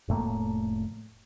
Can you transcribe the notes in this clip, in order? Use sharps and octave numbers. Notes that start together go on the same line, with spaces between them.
F1 A2 A3 A#3